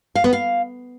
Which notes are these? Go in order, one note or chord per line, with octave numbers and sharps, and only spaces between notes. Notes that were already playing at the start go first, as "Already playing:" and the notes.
F5
B3
F5